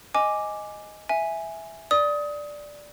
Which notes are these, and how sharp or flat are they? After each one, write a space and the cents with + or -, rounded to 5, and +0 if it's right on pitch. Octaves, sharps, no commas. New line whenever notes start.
D#5 +0 G#5 +0 D6 +0
E5 +0 G#5 +0
D5 +0 D#6 +25